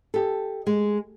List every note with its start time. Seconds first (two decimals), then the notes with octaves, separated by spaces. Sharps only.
0.14 G4 A4
0.67 G#3